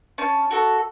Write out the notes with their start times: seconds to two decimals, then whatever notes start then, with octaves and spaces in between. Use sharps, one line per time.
0.18 C#4 A5
0.51 F#4 A4